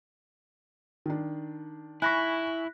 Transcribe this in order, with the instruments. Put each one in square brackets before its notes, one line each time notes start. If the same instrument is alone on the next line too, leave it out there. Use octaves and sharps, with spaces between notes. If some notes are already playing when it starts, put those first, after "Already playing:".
[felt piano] D#3 D4
[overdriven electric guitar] E4 [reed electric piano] G#5 B5 C#6 [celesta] F#6 A#6 B6